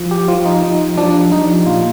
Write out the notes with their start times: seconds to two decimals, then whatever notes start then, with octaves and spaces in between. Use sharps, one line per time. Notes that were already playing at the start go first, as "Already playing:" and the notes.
Already playing: F3
0.11 G4
0.28 F3 F4
0.45 D#4
0.63 F3 D#4
0.97 F3 D4
1.32 F3 D#4
1.66 A#2 F4